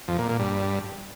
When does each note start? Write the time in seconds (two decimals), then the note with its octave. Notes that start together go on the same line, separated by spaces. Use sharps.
0.08 F2
0.18 A#2
0.29 A#2
0.39 G2